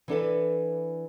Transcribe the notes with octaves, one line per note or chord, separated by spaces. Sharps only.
E3 D4 A4 B4